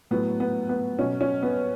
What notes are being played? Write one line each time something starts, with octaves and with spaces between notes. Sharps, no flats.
A2 F#3 B3
B3
B3
B2 F#3 C#4
C#4
B3